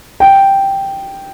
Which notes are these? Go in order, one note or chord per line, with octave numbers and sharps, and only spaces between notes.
G5